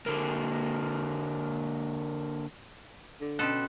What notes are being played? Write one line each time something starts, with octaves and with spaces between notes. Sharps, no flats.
D3 A#3
D3
B2 C#4 A4 C6 F#6